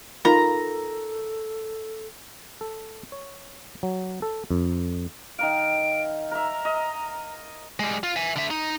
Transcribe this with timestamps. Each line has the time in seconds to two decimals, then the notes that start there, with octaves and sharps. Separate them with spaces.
0.25 D#4 F4 A4 A#4 A#5 B5
2.61 A4
3.12 C#5
3.83 F#3
4.22 A4
4.51 F2
5.39 D#3 A#4 F5 D7
6.31 A#4 E5 A#5
6.65 D#5
7.80 G3 G#3
8.03 F4
8.16 E5 G#5
8.36 D3 E5
8.51 D#4